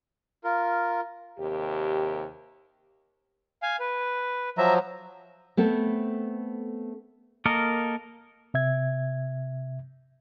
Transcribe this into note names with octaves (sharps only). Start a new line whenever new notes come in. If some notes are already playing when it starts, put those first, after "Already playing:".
F4 A#4
D#2 C3 G4
F5 G#5
B4
F3 F#3 E5 A#5
A3 B3 C4 A4
A#3 A4 A#4 D#5
C3 E5 G#6